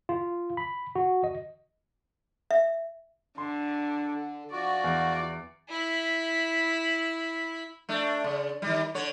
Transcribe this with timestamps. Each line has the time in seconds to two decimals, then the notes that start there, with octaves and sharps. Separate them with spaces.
0.09 F4
0.57 B5
0.95 F#4
1.24 D#5
2.51 E5
3.38 D3 C6
4.13 D3
4.52 F3 F#4 D5
4.84 E2
5.69 E4 B5
7.89 A3 D4
8.24 C#3
8.62 D#3 G3
8.95 D3 C#5